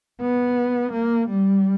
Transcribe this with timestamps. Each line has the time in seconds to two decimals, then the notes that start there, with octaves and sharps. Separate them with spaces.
0.21 B3
0.93 A#3
1.29 G3